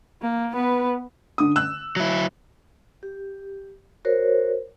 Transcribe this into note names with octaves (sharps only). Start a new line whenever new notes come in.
A#3
B3 B4
D3 D#6
E6 F#6
F#3 E4
G4
F#4 A#4 C5 C#5